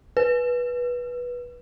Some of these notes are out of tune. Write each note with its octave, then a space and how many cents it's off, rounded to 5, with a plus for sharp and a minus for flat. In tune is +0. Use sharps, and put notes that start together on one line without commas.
B4 -15